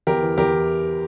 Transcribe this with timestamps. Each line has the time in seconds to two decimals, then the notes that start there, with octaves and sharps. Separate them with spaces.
0.07 E2 G4 A#4
0.22 E3
0.38 E2 G4 A#4
0.53 E3